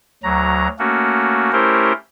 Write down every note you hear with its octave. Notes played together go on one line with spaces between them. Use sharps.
D2 F#3 A#5
A3 A#3 C#4 F#4
A3 C#4 E4 G4 A#4 C5